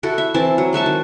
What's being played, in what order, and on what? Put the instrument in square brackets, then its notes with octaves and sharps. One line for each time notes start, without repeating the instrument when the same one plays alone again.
[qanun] E4 F#4 A4
E5
E3 C4 E4 A5
F#3
G#3 F#4 E5 A5
D#3